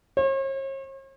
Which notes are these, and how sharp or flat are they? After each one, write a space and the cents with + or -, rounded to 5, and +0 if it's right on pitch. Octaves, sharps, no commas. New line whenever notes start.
C#5 -45